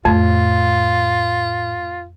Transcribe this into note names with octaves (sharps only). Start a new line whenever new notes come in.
F2 A2 F4